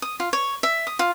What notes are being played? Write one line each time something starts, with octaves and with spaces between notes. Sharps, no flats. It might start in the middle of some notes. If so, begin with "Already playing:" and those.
D#6
F4
C#5
E5
D#6
F4